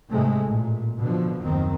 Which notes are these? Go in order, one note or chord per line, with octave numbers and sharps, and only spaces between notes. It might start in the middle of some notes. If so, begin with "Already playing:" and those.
G#2 C3 G#3 A3
A1 A#2
B2 D3 F3
F#1 D#2 D#3 C4